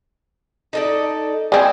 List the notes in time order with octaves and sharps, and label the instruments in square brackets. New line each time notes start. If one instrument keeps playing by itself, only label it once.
[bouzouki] D#4 A4 D5
[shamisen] G#3 C4 [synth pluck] D5 G#5